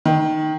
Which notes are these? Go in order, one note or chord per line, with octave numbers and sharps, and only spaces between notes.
D#3